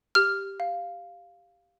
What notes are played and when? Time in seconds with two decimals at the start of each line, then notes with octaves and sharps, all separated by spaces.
0.15 G4 F6
0.60 F5